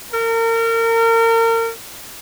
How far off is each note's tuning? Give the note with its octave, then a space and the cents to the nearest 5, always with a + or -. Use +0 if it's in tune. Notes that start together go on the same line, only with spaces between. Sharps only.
A#4 -35